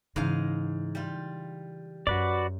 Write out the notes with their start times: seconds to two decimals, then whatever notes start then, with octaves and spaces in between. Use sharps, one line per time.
0.16 G#2 C#3 E3 D#5 F5
0.95 G3 F4
2.07 F#2 F#4 B4 D5